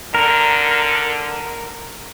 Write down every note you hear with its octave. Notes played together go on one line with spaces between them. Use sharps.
D3 A#4